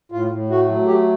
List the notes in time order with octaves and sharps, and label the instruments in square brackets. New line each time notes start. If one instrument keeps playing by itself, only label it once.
[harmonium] A2 F4
A2
A3 F#4
F#3
A3 G4